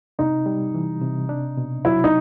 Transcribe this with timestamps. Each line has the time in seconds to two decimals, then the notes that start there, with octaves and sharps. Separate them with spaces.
0.19 C3 D#4
0.46 G3
0.75 E3
1.02 C3
1.29 D4
1.57 B2
1.85 F#3 E4
2.04 D#4